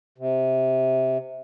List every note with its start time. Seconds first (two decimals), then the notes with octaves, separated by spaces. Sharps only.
0.18 C3